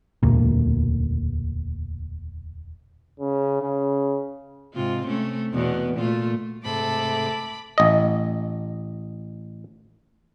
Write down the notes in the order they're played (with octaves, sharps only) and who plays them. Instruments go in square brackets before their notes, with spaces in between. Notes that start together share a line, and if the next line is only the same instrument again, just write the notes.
[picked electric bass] E1 D2 A#2
[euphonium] C#3
C#3
[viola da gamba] G#2 C3 F4
C3 A3 C#4
E2 B2 B3
A#2 A3 F4
[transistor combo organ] G#2 C3 [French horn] A3 [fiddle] A4 [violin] B5 D6
[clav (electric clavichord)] A1 D#5